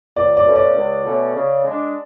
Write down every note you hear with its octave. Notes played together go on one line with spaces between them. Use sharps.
C#2 D5
D5
B2 A3 C#4
D5
C#2
B2 A3 C#4
C#3
G#3 D4